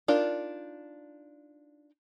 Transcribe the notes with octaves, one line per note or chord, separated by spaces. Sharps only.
D4 D#4 F4 A#4 D5